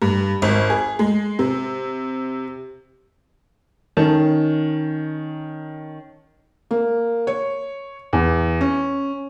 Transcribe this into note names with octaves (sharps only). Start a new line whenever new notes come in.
G2
G#1
G#4
G#3
C3
D#3 C#4 A5
A#3
C#5
E2
C#4